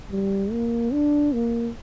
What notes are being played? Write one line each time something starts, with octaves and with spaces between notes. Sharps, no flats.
G3
A#3
D4
A#3